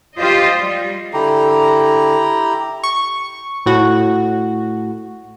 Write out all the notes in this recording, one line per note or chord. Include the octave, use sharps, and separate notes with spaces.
F4 G4 C5 D#5
G3
D3 E4 G4 A#5
C#6
A2 F#4